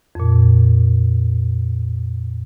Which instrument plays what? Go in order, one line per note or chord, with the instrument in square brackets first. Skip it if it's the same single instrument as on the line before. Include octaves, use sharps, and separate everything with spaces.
[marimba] F2 A#2